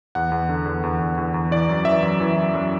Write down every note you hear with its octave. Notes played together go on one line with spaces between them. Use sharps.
E2 F#5
E2
D3
E2
E2
E2
E2
E2
E3 D5
F#2
E3 E5
F#2
E3
F#2
F#2